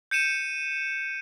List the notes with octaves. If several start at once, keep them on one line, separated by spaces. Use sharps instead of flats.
G6 C#7 D#7 E7